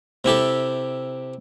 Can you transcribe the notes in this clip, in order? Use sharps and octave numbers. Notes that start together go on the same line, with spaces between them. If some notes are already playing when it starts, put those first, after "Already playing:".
C3 E4 G4 A4